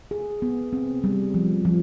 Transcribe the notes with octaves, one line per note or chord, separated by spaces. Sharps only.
G#4
B3
C4
G3
F3
F3